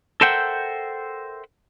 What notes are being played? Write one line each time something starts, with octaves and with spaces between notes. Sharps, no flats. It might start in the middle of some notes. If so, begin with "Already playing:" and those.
A4 A#4 C5 E5 F#5 G5